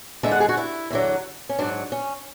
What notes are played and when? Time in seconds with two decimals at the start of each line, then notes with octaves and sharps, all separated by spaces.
0.23 E2 D3 G#3 E5
0.31 F#5
0.40 G#4
0.49 F#4
0.57 E4
0.90 E2 D3 F#3
1.49 C#4
1.59 G#2 F#3 D4
1.92 C#4